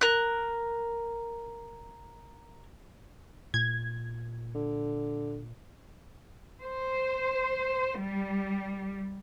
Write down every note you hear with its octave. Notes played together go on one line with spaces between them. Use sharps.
A#4 F#6
A#2 G#6
D3
C5
G3